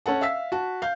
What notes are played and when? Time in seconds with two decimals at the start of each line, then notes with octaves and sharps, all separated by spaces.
0.06 C#4 A4 F#5 A5
0.21 E5 F5 E6 B6
0.52 F#4 A5
0.82 F5 G6